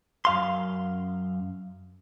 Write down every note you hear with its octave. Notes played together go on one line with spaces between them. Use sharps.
F#2 F5 C6